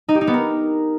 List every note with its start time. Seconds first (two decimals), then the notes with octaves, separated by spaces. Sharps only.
0.08 D#4
0.15 G4
0.21 D#4
0.27 B3
0.34 A#4